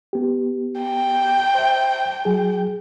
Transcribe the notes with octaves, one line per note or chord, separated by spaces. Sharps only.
B3 G4
G5
C5 E5
F#3 G#4